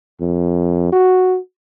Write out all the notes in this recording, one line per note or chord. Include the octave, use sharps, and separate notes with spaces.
F2
F#4